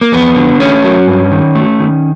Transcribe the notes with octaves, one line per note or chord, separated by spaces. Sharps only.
A#3
F2 B3
D3
A3 C#4
F#3
G2
D#3
A3
D#3